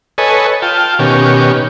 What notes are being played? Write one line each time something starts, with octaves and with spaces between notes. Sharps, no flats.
A4 B4 C#5 D#5 G#5
F4 G5 A5
B2 D#3 C#4 G4